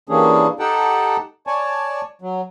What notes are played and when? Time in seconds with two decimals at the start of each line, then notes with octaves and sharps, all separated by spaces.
0.09 E3 G3 A#3 C#4 D4 G#4
0.59 D#4 G4 A4 F#5 G5 A5
1.47 C#5 D5 G#5 A5
2.22 F#3